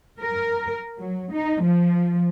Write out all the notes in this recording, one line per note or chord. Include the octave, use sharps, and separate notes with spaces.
A#4
F#3
D#4
F3